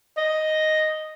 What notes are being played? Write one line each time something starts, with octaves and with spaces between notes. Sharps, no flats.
D#5